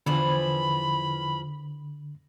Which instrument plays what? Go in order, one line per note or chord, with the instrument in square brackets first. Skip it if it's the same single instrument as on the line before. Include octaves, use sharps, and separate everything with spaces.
[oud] E2 E3 F3 [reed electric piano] D3 [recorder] B5